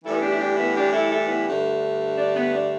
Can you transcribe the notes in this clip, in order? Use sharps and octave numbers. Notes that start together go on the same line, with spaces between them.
A2 E3 G3 B3 E4 A4
D4 G4
E4
D4 G4
B3 E4
D4 G4
E4 A4
E4 A4
B3 E4
G2 D3 A3
D4
B3
D4